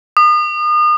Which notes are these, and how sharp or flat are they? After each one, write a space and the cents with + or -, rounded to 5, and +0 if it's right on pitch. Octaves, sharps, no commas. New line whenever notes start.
D#6 -35